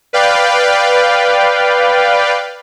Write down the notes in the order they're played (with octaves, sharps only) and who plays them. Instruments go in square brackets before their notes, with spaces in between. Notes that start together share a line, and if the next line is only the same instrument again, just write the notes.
[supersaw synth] B4 D5 F5 G5